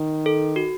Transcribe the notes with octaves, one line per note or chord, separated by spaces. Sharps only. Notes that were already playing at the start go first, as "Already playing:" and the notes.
Already playing: D#3
A4
F#4